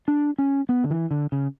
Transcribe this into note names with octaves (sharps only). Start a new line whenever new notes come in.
D4
C#4
B3
D3
E3
D3
C#3